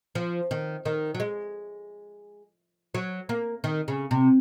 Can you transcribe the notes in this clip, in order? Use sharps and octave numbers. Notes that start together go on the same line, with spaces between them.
F3
D#3
D#3
F#3
G#3
F#3
A#3
D#3
C#3
C3